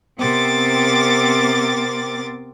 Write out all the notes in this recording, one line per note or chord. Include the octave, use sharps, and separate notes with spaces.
C3 B3 C4 A#4 D6 A6